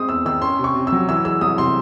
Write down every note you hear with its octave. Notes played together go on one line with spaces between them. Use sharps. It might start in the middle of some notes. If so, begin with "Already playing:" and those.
Already playing: G#3 C4 D#6
E2 E6
D#3 E6
C#4 C6
C3
C#6
C3
E6
F#3
E3 E6
G#3 E6
C2 D#6
C3 C6